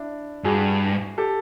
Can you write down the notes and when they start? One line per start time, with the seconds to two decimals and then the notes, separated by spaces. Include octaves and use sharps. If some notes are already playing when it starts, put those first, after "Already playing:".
Already playing: D4 E4
0.44 G2 F#4 G#4
1.18 G4 A4